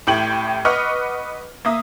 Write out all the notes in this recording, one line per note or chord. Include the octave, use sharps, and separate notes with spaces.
A1 A2 G4 G5 F#7
B4 D#5 F#5 C#6 D6 F6
A#3 E5 D#6